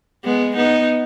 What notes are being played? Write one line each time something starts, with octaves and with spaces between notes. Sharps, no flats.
G#3 B3
B3 D#4